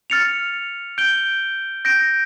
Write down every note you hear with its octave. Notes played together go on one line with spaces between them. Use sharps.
F6 A6 C#7 F7
G6 D7 G7
G6 A#6 D7